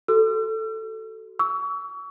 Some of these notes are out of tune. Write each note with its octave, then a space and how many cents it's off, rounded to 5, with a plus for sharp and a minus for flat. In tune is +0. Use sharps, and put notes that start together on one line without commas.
F#4 +35 A4 +5 E6 +45
C#6 +35 E6 -10